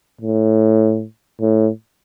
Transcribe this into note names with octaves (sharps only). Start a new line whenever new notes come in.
A2
A2